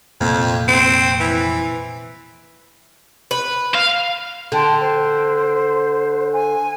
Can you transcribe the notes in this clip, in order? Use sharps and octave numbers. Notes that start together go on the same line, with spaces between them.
F1 F2 A#2 A#3
C4
E3
B4
F5
D3 G5 A5 C6
C5
G#5